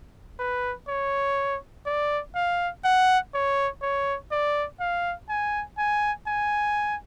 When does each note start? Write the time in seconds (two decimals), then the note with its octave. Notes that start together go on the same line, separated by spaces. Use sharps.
0.39 B4
0.88 C#5
1.86 D5
2.35 F5
2.84 F#5
3.34 C#5
3.82 C#5
4.31 D5
4.80 F5
5.29 G#5
5.78 G#5
6.27 G#5